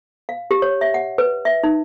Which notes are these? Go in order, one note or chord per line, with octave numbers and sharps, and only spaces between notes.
F5
G4
C#5
E5
F#5
B4
E5
D#4